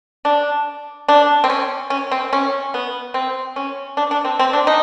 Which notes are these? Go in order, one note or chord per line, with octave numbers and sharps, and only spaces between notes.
D4
D4
C4
C#4
C#4
C4
C#4
B3
C4
C#4
D4
D4
C4
C4
D4
D#4